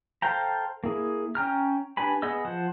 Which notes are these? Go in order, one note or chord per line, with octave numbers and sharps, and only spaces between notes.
A4 C5 F5 G5 A#5
A#3 E4 G#4
C#4 G5 A#5 F6
D4 G4 B4 G#5 B5
B3 G#4 D#5 E6
F3 C5 F#5